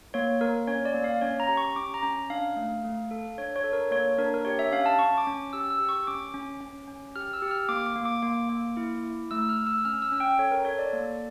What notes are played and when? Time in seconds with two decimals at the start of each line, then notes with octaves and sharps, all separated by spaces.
0.14 A#3 C#5
0.41 A#3 A#4
0.67 C#4 C#5
0.85 D5
0.94 A#3
1.04 F5
1.21 C#4 C#5
1.40 A#5
1.48 G4
1.57 C#6
1.76 C#4 D6
1.94 A#5
2.03 C#4
2.30 D4 F5
2.56 A3
2.84 A3
3.11 A4
3.38 D4 C#5
3.56 C#5
3.64 A4
3.73 A#4
3.91 A#3 C#5
4.18 D4 A#4
4.34 A#4
4.45 G4 C#5
4.59 E5
4.72 C#4 F5
4.86 A5
4.99 C#4 C#6
5.18 D6
5.27 C#4
5.53 G4 E6
5.71 E6
5.80 G4
5.89 C#6
6.07 C#4 D6
6.34 C#4
6.61 C#4
6.88 C#4
7.16 G4 F6
7.33 E6
7.42 G4
7.51 F6
7.69 A#3 D6
7.86 D6
7.95 A#3
8.05 D6
8.22 A#3 D6
8.49 A#3
8.77 E4
9.04 E4
9.31 A3 E6
9.49 F6
9.57 A3
9.67 E6
9.85 C#4 F6
10.02 E6
10.12 C#4
10.20 G5
10.39 A4 C#5
10.51 A#4
10.65 A4 C#5
10.79 D5
10.93 A#3